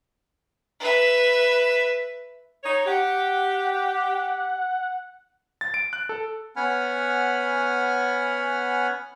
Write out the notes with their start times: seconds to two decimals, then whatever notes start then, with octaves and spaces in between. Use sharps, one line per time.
0.80 B4 E5
2.64 D#4 C#5
2.86 G4 F#5
5.61 A6
5.74 D7
5.93 F#6
6.09 A4
6.56 B3 C#4 F#5 G#5 B5 F6